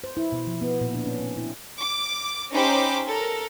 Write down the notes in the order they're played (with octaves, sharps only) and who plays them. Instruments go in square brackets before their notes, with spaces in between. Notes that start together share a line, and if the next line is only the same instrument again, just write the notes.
[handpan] C5
E4
B2
F3
B3
A#2
D4
C#4
C4
E4
[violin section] D6
C#4 D#4 G4 C5 B5 D6
A4 A#4